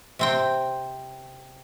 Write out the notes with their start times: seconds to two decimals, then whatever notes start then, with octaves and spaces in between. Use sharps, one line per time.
0.19 C3 C4 G5